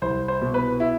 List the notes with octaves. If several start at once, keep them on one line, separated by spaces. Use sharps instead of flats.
C2 C5
C5
B2
B4
E4